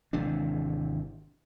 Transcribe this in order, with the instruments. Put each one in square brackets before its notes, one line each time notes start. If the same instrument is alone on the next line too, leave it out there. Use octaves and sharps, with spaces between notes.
[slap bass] G#1 C3 E3 D4